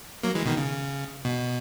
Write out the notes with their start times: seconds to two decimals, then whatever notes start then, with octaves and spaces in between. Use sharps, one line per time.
0.23 F#3 A#3
0.35 E3 G#3
0.46 B2 D#3
0.57 C#3
1.25 B2